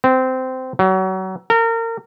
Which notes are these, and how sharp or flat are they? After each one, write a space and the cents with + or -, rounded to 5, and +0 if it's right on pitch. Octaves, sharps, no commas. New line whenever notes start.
C4 -15
F#3 +30
A#4 -30